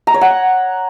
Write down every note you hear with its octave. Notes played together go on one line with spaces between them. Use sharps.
A#5
C#5
F#5